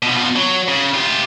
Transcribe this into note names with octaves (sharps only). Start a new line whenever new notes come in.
B2 F3
B2 F4
F#3
C#3
F4 G4